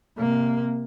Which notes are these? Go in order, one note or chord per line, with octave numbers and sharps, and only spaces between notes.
C3 A#3